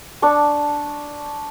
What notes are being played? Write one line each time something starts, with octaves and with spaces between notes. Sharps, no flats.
D4 A5 C#6